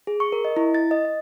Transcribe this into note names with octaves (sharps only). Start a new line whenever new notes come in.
G#4
C#6
A#4
D#5
E4
A6
D#5
D#5